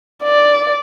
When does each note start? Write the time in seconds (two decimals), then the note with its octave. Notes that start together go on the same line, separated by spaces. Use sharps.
0.23 D5